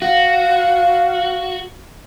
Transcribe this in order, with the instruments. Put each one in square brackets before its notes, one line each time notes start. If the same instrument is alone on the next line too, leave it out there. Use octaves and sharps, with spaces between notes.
[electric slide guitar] F#4 [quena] F5